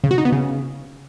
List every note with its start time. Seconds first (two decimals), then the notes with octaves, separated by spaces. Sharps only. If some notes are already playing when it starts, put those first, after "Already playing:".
0.04 C#3
0.11 F#4
0.18 D#4
0.25 B3
0.32 C#3